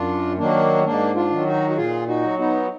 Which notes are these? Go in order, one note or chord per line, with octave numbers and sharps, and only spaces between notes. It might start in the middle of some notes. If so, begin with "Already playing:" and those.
Already playing: F#2 D4 F4
D#3 F#3 A#3 D4
G#2 A#3 D4
D4 F4
D#3 F#3
D#4 F#4
F#4
A#2 F4 G#4
D#4 F#4
F#3
B3 D#4